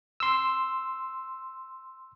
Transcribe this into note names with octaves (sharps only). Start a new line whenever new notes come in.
C6 E6